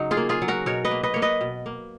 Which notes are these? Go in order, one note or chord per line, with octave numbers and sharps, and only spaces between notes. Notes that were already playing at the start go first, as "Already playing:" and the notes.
Already playing: C#3 F#3 D#4
F4 G#4
A#3
F4 G#4
F#3
F#4 A#4
B2 A#4 C#5
B4 D#5
A#3
B4 D#5
A#3 C#5
B4 D#5
B2
A#3